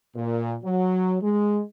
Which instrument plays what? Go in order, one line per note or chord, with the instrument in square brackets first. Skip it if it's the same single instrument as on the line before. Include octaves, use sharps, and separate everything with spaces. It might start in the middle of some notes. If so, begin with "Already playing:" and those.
[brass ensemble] A#2
F#3
G#3